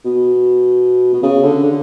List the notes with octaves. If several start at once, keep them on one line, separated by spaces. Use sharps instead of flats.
B2
B2
C#3
D3
D3